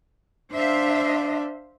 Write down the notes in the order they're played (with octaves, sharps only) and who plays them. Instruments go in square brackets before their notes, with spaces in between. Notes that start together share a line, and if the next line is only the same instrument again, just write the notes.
[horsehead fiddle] D4 [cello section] C5 E5 F5